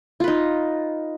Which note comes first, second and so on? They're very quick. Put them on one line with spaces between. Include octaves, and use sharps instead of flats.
F4 B4 D#4